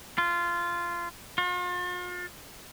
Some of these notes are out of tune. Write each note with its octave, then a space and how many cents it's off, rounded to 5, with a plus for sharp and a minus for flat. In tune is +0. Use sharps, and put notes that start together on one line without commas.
F4 -15
F4 +40